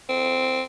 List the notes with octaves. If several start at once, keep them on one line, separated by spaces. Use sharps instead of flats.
C4